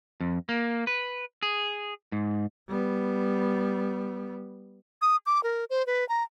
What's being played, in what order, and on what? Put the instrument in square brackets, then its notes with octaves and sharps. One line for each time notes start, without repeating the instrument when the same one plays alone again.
[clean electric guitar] F2
A#3
B4
G#4
G#2
[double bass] G3 B3
[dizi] D#6
D6
A#4
C5
B4
A#5